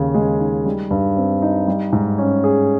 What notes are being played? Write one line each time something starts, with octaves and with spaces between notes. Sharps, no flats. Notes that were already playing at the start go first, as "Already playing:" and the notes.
Already playing: D#2 C#3 G#4
G#3
D#4
G3
G2
C4
D#4
G3
G#2
C#4
G#4